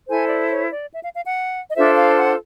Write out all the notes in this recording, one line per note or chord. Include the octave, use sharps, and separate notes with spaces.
E4 A4 C5 G#5
D5
C#5
D5
E5
F5
F5
F#5
D#5
D4 F4 A4 C5 E5
F5
F#5